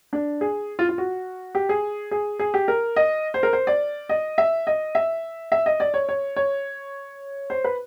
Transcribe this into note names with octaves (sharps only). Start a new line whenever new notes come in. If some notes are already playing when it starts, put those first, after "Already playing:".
D4
G#4
F4
F4
F#4
G4
G#4
G#4
G#4
G4
A#4
D#5
C5
A#4
C5
D5
D#5
E5
D#5
E5
E5
D#5
D5
C#5
C#5
C#5
C5
B4